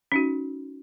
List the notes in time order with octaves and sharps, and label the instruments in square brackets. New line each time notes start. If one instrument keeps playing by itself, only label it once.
[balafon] C#4 D#4 F#4